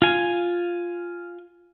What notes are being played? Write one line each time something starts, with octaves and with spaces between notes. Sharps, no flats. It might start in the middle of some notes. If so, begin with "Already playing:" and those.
F4 G#5